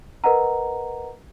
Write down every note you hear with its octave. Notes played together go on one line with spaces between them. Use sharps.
A#4 B4 D#5 F#5 A#5